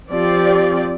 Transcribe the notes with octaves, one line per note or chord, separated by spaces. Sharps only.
F3 C4 G4 D5